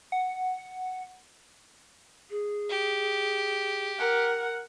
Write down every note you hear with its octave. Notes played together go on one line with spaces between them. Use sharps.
F#5
G#4
G4
A#4 F#5